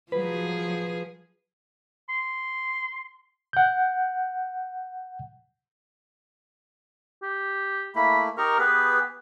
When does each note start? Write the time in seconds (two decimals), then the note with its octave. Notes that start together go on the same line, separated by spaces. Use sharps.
0.12 F3 F#3 G#4 B4
2.09 C6
3.53 F#5 G6
7.23 G4
7.96 A3 A#3 E4 B5
8.38 D#4 G4 A#4 C#6
8.59 B3 G4 G#4 B4